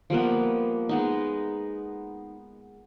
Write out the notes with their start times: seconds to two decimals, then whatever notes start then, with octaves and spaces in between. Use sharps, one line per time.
0.10 F3 G3 A#3 B3
0.89 G#3 B3 D#4